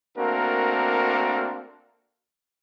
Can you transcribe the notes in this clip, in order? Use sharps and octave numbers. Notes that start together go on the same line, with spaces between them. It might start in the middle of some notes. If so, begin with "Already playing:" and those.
A3 A#3 C4 D4 F#4 A#4